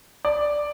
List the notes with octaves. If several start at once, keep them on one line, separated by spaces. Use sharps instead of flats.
D5